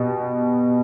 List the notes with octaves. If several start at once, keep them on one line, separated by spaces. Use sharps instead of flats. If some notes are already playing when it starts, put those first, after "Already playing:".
Already playing: B2 G4